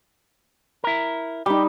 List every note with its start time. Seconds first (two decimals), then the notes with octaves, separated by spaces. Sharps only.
0.84 E4 A#4
1.46 G3 D#4 G4